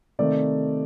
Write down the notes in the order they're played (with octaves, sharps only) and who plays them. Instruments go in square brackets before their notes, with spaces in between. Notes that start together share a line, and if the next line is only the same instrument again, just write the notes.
[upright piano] C3 D#3 A3 D5